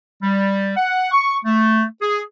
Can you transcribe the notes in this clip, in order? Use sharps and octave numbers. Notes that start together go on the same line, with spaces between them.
G3
F#5
C#6
A3
G#4